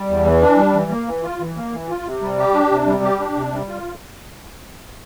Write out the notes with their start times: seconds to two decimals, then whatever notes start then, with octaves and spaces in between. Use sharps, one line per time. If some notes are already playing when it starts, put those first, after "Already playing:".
Already playing: G3
0.08 E2
0.25 E3
0.42 D4
0.57 G3
0.74 E3
0.91 A#3
1.07 E3
1.23 F4
1.40 E3
1.56 A#3
1.73 E3
1.88 F4
2.06 C3
2.22 G3
2.39 G4
2.54 D4
2.71 C3
2.87 G3
3.03 G4
3.19 D4
3.36 C3
3.53 G3
3.69 F4